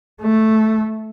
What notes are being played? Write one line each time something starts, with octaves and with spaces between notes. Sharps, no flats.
A3